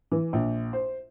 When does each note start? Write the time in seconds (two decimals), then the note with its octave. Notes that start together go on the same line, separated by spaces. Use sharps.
0.12 E3
0.33 A#1
0.73 C5